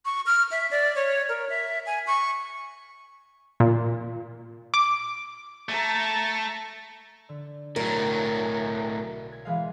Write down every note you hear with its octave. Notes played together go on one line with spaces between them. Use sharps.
C#6
F6
E5
D5
C#5
A#4
E5
G#5
C#6
A#2
D6
A3 A5 A#5
D3
B1 A2 F#3 A#4
G#6
E3 G#3 F5